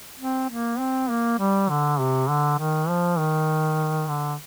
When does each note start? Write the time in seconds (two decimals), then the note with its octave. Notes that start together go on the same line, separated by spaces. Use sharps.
0.19 C4
0.50 A#3
0.79 C4
1.10 A#3
1.39 G3
1.69 D3
1.99 C3
2.29 D3
2.59 D#3
2.89 F3
3.19 D#3
4.09 D3